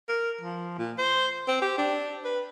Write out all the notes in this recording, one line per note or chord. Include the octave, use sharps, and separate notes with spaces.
A#4
F3
A#2
C5
C4
G4
D4
B4